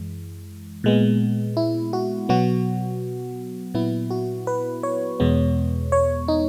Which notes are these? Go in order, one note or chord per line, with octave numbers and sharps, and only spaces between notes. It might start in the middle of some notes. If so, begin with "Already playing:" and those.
Already playing: F#2 E3 G#3
A#2 G#3 B3
E4
F#4
B2 F#3 B3 F#4
A#2 F#3 B3 E4
F#4
B4
C#5
E2 B2 G#3 B3
C#5
D#4